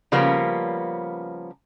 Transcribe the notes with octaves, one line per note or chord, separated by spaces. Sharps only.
C#3 F3 G3 A#3 B3 C#4